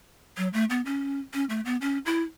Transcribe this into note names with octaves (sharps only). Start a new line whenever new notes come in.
F#3
A3
B3
C#4
C#4
A3
B3
C#4
E4